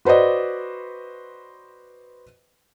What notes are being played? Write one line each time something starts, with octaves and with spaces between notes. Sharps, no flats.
F#4 B4 C5 D5 D#5